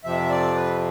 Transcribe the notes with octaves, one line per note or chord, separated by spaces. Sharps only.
F2 C3 F3 E5
D5
B4